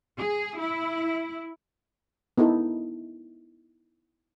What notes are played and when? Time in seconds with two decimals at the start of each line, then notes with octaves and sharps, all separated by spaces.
0.18 G#4
0.60 E4
2.38 B3 D#4 E4 A4